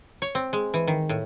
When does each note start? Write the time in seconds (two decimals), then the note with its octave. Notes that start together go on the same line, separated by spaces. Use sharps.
0.22 C#5
0.35 C4
0.53 G#3
0.74 E3
0.88 D#3
1.09 A2